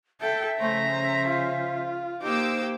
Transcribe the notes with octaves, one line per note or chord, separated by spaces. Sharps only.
A4 E5 G5
C#3 F3 A3 C#4 C5 A#5
C5
F4
A#3 D#4 G4 C5 D6 E6